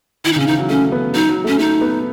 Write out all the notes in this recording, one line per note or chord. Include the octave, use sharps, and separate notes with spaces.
D#3 E4
D#4
C#3
C#4
E3 D#4
F#3
A3 C#4
B3
F#3 D#4
F#3
A3
C#4
A3 D#4
B3